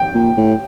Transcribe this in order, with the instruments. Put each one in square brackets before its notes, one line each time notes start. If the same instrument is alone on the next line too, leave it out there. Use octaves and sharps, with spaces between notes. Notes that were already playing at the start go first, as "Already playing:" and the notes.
Already playing: [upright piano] G5
[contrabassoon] A#2
A2